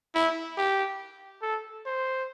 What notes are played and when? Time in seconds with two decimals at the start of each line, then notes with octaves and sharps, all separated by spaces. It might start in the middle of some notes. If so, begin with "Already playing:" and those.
0.15 E4
0.58 G4
1.42 A4
1.86 C5